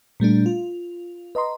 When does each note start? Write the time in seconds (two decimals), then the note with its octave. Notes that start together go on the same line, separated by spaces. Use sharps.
0.20 A#2 G3 A3 D4
0.46 F4
1.35 B4 D#5 A#5 C6